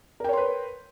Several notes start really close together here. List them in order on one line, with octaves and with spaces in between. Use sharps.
A#4 G5 C#5 C6 B4